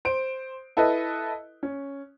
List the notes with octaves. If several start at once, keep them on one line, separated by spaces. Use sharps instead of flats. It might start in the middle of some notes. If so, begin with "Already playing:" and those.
C5 D7
E4 A4 B4 D#5
C#4